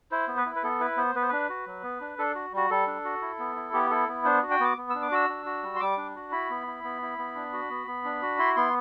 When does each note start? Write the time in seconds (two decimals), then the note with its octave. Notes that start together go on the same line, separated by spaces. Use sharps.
0.11 E4 C5
0.28 B3
0.37 B4
0.46 E4
0.56 B4
0.63 B3 A4
0.80 E4 B4
0.97 B3 C5
1.15 B3 B4
1.22 C5
1.29 D4 B4
1.49 F#4
1.67 F#3
1.83 B3
2.00 D4
2.18 D4 A4
2.35 F#4
2.52 G3 F#4
2.70 G3 A4
2.87 D4
3.04 F#4
3.21 E4
3.39 B3
3.56 E4
3.73 B3 G4
3.90 E4 A4
4.08 B3
4.25 D4 C5
4.43 F#4
4.51 G5
4.60 B3 D6
4.77 B3
4.90 E6
4.95 D4
5.02 D6
5.11 F#4 E6
5.29 D4
5.46 F#4
5.63 G3
5.76 C6
5.80 G3 D6
5.97 D4
6.16 F#4
6.32 E4 B5
6.50 B3
6.67 E4
6.84 B3
7.02 E4
7.18 B3
7.35 D4
7.53 F#4
7.70 B3
7.87 B3
8.04 D4
8.22 F#4
8.39 E4 C6
8.56 B3 C6